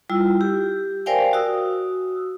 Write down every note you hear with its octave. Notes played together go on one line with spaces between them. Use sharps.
G3 E4 F4 E6
G4
A#4 C5 D5 F5 G5 G#5
F#4 D#6 E6